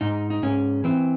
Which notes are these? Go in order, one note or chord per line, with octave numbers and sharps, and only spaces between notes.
G#2 D#4
D#4
G#2 C#4
E3 C4